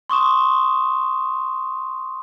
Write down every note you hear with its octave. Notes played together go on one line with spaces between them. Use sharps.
C6 C#6 D#6 E7